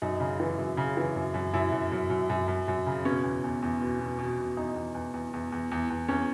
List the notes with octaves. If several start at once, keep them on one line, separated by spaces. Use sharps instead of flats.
F#2 D#4
C#3
E3
F#2
C#3
E3
F#2
F#2
F#2 E4
F#2
F#2
F#2
F#2
F#2
F#2
C#3
B2 C#4
E2
E2
E2
B2
B2
B2
B2
E2 D#4
E2
E2
E2
E2
E2
E2
E2
E2 C#4